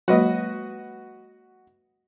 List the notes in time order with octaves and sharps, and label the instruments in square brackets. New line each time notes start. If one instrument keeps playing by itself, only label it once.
[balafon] F#3 G#3 A#3 [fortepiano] F#4 B4 D#5